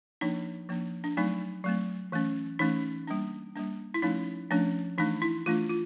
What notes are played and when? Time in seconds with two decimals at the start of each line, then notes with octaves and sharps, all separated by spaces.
0.21 F3 A#3 D4 D#4
0.69 F3 A#3 D4
1.04 D4
1.17 F#3 A3 C4 D#4
1.64 F#3 A3 C4
2.12 E3 A3 C#4
2.59 E3 A3 C#4 D#4
3.07 G3 A#3 D4
3.56 G3 A#3 D4
3.94 E4
4.02 F3 A3 C#4 D#4
4.51 F3 A3 C#4 D4
4.98 E3 A3 D4 D#4
5.22 E4
5.46 E3 A3 D4 F4
5.69 F4